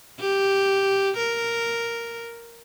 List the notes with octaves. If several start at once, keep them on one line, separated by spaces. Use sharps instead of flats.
G4
A#4